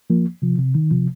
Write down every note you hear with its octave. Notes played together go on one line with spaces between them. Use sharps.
F3 A#3
C3 F3
C3
D#3
C3 F3